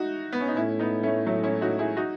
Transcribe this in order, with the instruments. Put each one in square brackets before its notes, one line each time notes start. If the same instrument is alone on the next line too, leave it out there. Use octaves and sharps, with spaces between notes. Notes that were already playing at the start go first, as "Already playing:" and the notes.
Already playing: [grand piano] D#4 E4 F#4
B3
C#4
D#4
[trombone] A2 [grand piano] C#4 E4
[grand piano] B3 D#4
A3 C#4
F#3 A3
C#4 E4
D#4 F#4
E4 G#4
D#4 F#4